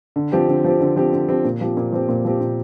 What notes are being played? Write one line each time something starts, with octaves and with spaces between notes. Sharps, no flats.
D3
F3 C4 G4
D3
F3 C4 G4
D3
F3 C4 G4
D3
F3 C4 G4
A#2
F3 C4 G4
A#2
F3 C4 G4
A#2
F3 C4 G4
A#2